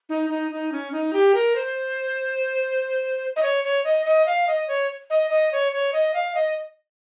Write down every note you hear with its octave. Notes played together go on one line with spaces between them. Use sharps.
D#4
D#4
D#4
C#4
D#4
G4
A#4
C5
D#5
C#5
C#5
D#5
D#5
F5
D#5
C#5
D#5
D#5
C#5
C#5
D#5
F5
D#5